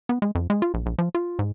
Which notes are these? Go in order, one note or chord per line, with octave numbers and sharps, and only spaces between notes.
B3
G#3
F2
G#3
F4
A#1
A#1
F3
F4
G#2